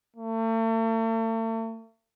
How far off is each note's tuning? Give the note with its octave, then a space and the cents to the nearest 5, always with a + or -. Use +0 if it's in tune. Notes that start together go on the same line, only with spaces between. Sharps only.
A3 +40